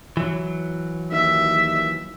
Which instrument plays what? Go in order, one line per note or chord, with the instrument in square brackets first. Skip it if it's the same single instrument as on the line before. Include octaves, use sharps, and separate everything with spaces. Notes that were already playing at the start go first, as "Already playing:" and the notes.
[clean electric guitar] E3 F#3
[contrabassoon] D#2 [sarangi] E5